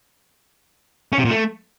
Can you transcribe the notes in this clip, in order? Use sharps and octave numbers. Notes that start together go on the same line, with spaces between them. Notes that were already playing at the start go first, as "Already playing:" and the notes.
C#4
C3
A#2
A3